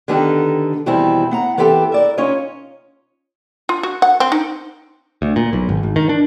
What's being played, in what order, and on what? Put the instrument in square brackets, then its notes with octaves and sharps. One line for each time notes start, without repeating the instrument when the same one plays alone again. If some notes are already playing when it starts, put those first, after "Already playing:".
[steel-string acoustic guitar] D3 D#3 B3 D#4 G4 A4
E2 B2 D#3 G3 C4 E4
B3 F#5 A#5
E3 B3 C4 G4 A4
A#4 D5 E5
C#4 D#4 F4 C#5 D#5
[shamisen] F4
F#4
F#5
C4
D#4
[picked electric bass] D2
A#2
B1
G#1
G#1
D#3
D4